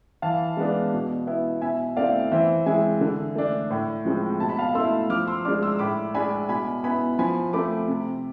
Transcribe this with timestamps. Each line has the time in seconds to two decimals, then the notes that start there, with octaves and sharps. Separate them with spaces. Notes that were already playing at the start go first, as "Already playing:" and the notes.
0.22 E3 F5 A5
0.57 G#3 B3 D4
0.93 B2
1.27 B3 E4
1.62 B2 E5 G#5
1.96 A3 C4 E4 D5 F5
2.32 E3 C5 E5
2.66 G#3 C4 E4 E5 G#5
3.01 D3
3.35 A3 D4
3.71 A2
4.05 F3 G#3 C4
4.40 B2 A5
4.49 B5
4.58 F5 A5
4.75 A3 E4 C6 E6
5.10 F3 D6 F6
5.27 C6 E6
5.45 D4 D6 F6
5.48 G#3
5.62 C6 E6
5.79 A2 B5 D6
6.14 G#3 D4 G#5 B5
6.49 B2 G#5 B5
6.84 B3 E4 G#5 B5
7.19 F3 G#5 B5
7.53 A3 C4 B5 D6
7.88 C3